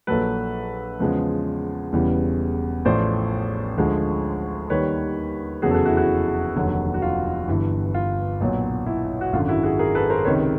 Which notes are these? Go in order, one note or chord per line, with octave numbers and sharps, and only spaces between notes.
A#1 A#2 F#3 A4 B4
E2 C#3 F3 G#3
E1 E2 C#3 E3 G3
A1 A2 F3 C5 D5
D2 D3 F3 G#3
D#2 D#3 G3 B4 C#5
F1 E2 C#3 F#3 F#4 G#4
A4
F#4 G#4
E4 F#4
E4 F#4
F1 D#2 D3 F#3
F#4
F4
G1 G2 E3
F4
B1 A#2 F#3
E4
F#4
G#1 F#2 D3 F4
E4 F#4
F#4 G#4
G#4 A#4
A4 B4
A#4 C5
C#2 C3 D#3 B4 C#5